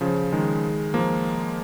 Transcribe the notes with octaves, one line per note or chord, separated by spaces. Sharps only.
C#3 F3
D#3 G#3
F3 A#3